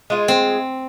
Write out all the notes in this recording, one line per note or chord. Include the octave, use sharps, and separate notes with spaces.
G#3 F4
C4